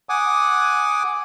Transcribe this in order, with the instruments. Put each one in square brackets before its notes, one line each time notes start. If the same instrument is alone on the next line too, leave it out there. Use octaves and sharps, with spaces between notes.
[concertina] F#5 G#5 D6 D#6